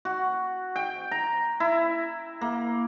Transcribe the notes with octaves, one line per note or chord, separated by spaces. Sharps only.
F#4
G5
A#5
E4
A#3